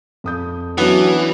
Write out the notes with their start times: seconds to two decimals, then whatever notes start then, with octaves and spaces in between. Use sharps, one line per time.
0.24 F2 D#6 G6
0.78 E3 F#3 B3 C#4 D4 F#5